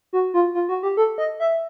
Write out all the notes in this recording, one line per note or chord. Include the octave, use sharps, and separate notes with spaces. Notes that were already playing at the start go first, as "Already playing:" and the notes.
F#4
F4
F4
F#4
G4
A4
D#5
E5